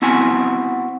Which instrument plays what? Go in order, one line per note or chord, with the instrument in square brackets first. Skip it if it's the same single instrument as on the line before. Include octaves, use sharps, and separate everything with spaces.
[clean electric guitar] B3 C4 E4 F#4 F#5 G#5